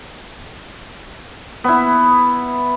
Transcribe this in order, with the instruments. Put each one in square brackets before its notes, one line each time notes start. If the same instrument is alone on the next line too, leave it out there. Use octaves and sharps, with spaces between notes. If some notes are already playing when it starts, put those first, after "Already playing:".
[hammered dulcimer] B3 E4